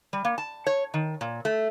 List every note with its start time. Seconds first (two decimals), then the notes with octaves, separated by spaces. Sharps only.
0.13 G3
0.25 A#3
0.38 A5
0.67 C#5
0.94 D#3
1.21 A#2
1.45 A3